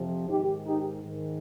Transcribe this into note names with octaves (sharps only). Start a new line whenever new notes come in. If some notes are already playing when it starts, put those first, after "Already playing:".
Already playing: F2 C3 F3
G#2 D#3 D#4 G4
D#4 G4
G#2 D#3